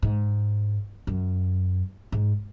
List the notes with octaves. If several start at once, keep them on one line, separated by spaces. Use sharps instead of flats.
G#2
F#2
G#2